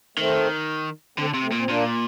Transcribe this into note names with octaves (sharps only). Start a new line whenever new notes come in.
D#3 A3 C4
D3 A3 C4
C3
A3 C4
A#2
C4
A#2 A#3 D4